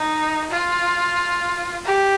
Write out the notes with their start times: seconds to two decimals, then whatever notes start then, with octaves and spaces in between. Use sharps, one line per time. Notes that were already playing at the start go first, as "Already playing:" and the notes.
Already playing: D#4
0.50 F4
1.85 G4